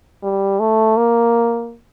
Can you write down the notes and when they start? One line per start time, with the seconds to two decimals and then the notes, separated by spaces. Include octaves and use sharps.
0.23 G3
0.60 A3
0.97 A#3